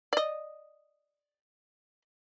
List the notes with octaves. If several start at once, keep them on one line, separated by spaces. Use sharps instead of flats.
D5 D#5